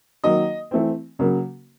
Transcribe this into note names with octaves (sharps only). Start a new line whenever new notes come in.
D#3 F#3 A#3 D#5
E3 A3 C4
C#3 F#3 A#3